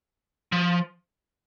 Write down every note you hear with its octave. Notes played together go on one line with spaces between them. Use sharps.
F3